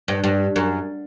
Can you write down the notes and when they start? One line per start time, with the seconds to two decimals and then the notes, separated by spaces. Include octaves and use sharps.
0.08 G2
0.24 G2
0.56 F#2